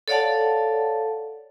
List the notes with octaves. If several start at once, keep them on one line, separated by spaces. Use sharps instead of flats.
A4 C#5 D5 F5 F#5 A5